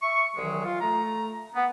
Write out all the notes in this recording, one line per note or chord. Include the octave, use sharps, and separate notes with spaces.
E5 C#6
C2 D#3 E3 F#3 G#3
F4
A3 A#5
B3